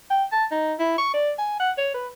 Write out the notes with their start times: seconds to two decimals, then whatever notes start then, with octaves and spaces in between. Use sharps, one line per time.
0.10 G5
0.32 A5
0.52 D#4
0.79 E4
0.98 C#6
1.14 D5
1.38 G#5
1.60 F#5
1.78 C#5
1.94 B4